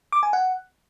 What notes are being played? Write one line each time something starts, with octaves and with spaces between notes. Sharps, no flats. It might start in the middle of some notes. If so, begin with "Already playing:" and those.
D6
G#5
F#5